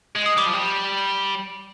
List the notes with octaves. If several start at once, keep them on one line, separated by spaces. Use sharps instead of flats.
G#3
D#6
G3 D6
F3
G3